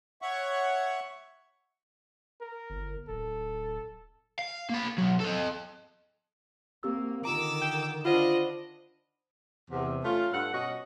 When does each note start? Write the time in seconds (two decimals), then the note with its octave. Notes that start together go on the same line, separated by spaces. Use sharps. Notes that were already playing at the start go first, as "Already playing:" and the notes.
0.22 C#5 E5 F#5 C#6
2.41 A#4
2.70 G1
3.08 D1 A4
4.39 F5
4.69 A#3 B5
4.98 B1 F#3
5.20 A4 D#5
6.83 A#3 C4 G4 E6
7.24 D3 D#3 F4 A#5 D6 E6 D7
7.61 G5
8.05 D4 F4 C5 D#5 F#5 B5
9.71 E2 C3
10.04 A3 C#4 F4
10.32 G2 A4 F#5
10.53 B2 C#4 F#4 D#5